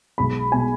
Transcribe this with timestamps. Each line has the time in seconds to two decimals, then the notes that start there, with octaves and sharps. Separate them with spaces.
0.18 B1 B2 G#3 B5
0.52 B2 G#3 G#5